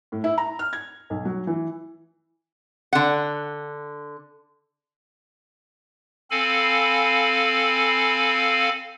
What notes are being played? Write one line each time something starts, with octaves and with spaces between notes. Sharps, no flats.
A2
E4
A#5
F6
G#6
B1
F#3
E3
D3 F#5
C4 A4 F5 G#5 B5